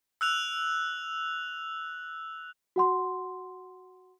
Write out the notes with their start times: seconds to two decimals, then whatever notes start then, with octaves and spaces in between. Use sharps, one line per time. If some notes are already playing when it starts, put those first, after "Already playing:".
0.21 E6 F#6 F7
2.76 F#4 F#5 C6